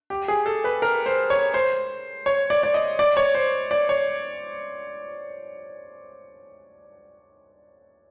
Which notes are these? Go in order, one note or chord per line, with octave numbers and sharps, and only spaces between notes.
G4
G#4
A4
B4
A#4
C5
C#5
C5
C#5
D5
D5
D#5
D5
C#5
C5
D5
C#5